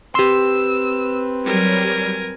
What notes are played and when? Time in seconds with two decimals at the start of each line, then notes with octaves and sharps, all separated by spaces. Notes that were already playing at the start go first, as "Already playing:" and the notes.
0.15 C4 G4 B4 C6 E6
1.46 F#3 G3 A#4 G#5